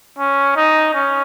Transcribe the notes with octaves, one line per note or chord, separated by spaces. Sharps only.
C#4
D#4
C#4